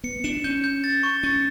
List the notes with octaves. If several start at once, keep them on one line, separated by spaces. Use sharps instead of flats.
B3 C#7
D4 E7
C#4 G6
G6
A6
C#6
C#4 A6